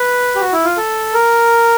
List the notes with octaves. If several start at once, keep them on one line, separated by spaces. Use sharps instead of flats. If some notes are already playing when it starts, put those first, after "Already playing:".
Already playing: B4
G4
F#4
E4
F4
A4
A#4